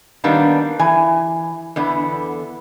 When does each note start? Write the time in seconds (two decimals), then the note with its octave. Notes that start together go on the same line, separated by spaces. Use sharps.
0.24 D#3 G3 A#3 B3 D4
0.79 E3 G#5
1.76 E2 D3 B3